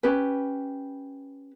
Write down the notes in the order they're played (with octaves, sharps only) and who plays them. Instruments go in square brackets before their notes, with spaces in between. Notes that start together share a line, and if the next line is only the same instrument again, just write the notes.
[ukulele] C#4 G4 B4